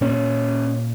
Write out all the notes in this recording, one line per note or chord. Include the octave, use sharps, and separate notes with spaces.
A#2 C#4